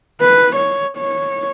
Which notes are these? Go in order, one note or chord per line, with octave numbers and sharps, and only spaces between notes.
B4
C#5
C#5